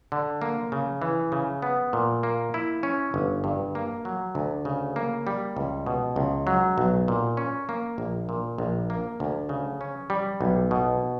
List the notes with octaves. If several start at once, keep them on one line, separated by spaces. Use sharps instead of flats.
D3
A#3
C#3
E3
C#3
B3
A#2
A#3
E4
C#4
G1
G2
A#3
F#3
D2
C#3
A#3
G3
C#2
B2
C#2
F#3
B1
A#2
C#4
A#3
A#1
A#2
A#1
A#3
D2
C#3
C#4
G3
B1
B2